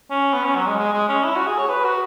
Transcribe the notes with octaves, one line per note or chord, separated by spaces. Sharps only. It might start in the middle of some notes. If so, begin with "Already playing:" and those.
C#4
B3
C#4
F#3
G#3
G#3
G#3
C#4
E4
F#4
G#4
C#5
B4
F#4